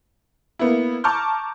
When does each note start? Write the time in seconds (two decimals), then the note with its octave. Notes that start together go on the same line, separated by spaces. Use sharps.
0.59 A#3 B3 E4
1.04 A5 A#5 C#6 D6 F6 G6